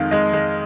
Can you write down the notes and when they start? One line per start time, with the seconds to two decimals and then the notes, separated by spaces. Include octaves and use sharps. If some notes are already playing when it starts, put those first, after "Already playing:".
Already playing: F2 D#3 G#3 F5
0.11 G#3 D#5
0.33 G#3